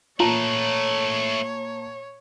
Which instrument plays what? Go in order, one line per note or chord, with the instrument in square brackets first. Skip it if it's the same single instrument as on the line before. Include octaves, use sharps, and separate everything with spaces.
[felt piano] A#2 A5 A#5 [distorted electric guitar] A3 B4 [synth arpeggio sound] F4 [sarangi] C#5